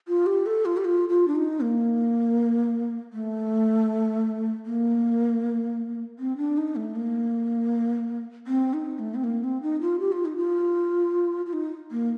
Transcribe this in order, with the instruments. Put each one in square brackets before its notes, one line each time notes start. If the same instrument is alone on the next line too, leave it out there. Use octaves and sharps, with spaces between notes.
[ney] F4
G4
A4
F4
G4
F4
F4
D4
D#4
A#3
A3
A#3
C4
D4
D#4
A3
A#3
C4
D#4
A3
C4
A#3
C4
D#4
F4
G4
F4
D#4
F4
F4
D#4
A#3